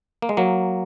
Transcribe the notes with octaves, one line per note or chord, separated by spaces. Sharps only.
A#3
G#3
F#3 A#3